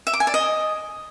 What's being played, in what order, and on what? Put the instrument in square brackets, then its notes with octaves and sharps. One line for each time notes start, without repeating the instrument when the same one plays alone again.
[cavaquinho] E5
D6
G#5
D5
D#5